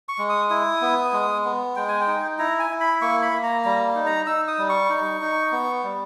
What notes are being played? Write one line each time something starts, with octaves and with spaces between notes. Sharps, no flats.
C#6
G#3
D#6
E4 D#6
B3
G#3
B3
G#3 G5
G#5
G5
D#4
E4 A#5
G#5
E4
B5
A#3 C#6
B5
A#3
A#5
G3 A#5
D#4
A#5
D#4 E6
D#6
G3
C#6
D#4
D#4
B3
G3